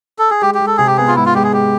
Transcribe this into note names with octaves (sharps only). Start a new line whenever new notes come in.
A4
G#4
G#3 G4
G4
G#3
A4
C3 G#4
G4
B3 G#4
F4
G#2 E4
F4
G#3 G4
G#4
G#3 G4